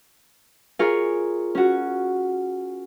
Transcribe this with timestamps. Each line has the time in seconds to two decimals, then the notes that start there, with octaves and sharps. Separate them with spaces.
0.79 F4 G#4 A#4 C#5
1.55 C#4 F#4